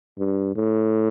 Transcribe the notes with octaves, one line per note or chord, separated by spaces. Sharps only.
G2
A2